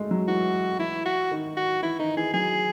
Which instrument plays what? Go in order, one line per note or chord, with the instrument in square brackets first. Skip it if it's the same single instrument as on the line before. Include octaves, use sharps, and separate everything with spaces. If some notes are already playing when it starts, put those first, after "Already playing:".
Already playing: [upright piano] G#3 A3
F#3
[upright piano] E3 [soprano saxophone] F#4
[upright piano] E3 [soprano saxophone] E4
[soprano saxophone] F#4
[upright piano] D#3
[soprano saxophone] F#4
[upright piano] E3 [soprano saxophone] E4
[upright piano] D#3 [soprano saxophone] D#4
[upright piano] E3 [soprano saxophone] G#4
[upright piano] F#3 [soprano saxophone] G#4